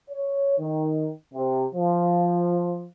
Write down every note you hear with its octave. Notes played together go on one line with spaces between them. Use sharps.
C#5
D#3
C3
F3